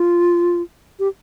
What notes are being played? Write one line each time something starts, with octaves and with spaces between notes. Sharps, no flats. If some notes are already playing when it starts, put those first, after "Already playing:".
Already playing: F4
G4